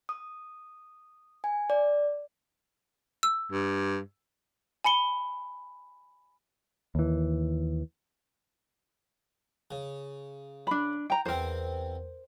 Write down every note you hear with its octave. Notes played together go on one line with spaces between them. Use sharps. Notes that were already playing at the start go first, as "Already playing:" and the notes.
D#6
G#5
D5
E6
G2
G#5 B5 C#7 G7
D#2 E3
C#3
D4 B5
G5 A#5
E2 C4 A#4 C5